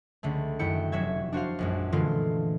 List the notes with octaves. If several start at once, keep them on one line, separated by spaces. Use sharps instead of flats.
C#2 D3 A3
F#2 D#3 E4 G5 C#7
F1 F#3 F#4 E5 G#6
D4 F#4 C5 F5
A#1 F#2 G#3
A#2 D3 E3 G#3 A3 F4